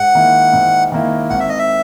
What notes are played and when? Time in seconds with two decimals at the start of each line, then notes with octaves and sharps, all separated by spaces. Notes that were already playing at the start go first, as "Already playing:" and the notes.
Already playing: G#2 F#5
0.15 D#3 A#3 E4
0.53 G#2
0.92 D#3 A#3 E4
1.30 G#1 F#5
1.40 E5
1.49 D#5
1.59 E5